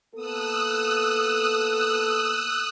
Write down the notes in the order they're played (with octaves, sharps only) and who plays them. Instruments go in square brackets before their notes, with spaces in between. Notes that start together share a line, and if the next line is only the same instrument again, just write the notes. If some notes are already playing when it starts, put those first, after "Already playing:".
[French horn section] A#3 B3 A4 [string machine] D#6 E6 F#6